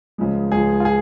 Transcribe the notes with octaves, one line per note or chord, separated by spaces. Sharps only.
C#2 C#3 F3 G#3
C#2 C#3 F3 G#4
F4
G#4